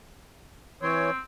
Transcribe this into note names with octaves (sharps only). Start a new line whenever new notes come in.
E3 C4 C#5